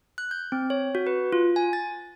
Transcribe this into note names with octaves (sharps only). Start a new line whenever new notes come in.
F#6
G6
C4
C#5
F#4
B4
F4
G#5
A6